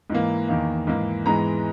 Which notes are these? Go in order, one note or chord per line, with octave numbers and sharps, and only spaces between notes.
G#2 E3 A#3
E2 D#3 A#3
G#2 E3 A#3
G#2 E3 G#3 B3 A#5